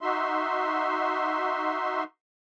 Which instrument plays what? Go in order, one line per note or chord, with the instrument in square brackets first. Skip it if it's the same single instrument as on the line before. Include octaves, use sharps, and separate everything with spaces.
[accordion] D#4 F#4 E5 C6